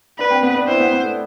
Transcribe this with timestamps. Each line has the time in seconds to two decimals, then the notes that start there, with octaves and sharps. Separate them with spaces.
0.19 D4 B4
0.30 C4
0.43 B3
0.55 D4
0.67 E4 C5
0.79 B3
0.92 B3
1.03 A3